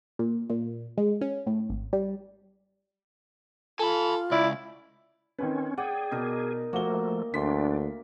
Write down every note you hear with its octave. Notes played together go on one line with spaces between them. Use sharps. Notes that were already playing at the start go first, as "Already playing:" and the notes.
A#2
A#2
G#3
C#4
A2
G#1
G3
F4 A4 G#5 B5
C#2 E4 D5
D#3 C4 C#4 B4
G#4 D5 F#5 G5
B2 D#4 A#4
F3 A3 A#3 F#4 G7
D2 D4 C6 B6